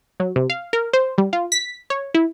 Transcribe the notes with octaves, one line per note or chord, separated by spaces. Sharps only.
F#3
C3
F5
A#4
C5
G3
F4
B6
C#5
E4